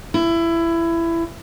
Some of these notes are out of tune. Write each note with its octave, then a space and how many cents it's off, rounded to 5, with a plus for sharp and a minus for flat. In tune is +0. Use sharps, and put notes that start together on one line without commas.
E4 +20